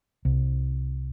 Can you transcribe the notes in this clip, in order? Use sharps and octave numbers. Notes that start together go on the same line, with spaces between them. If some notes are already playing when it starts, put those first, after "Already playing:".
C2